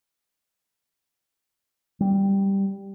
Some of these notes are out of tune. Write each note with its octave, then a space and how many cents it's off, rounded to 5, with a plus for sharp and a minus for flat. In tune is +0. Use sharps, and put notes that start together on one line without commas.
G3 +0